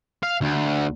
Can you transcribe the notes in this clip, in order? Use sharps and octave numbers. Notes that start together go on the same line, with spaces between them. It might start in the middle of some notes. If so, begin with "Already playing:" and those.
F5
D2